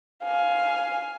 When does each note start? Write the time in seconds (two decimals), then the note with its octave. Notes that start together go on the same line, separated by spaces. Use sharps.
0.22 F5 G#5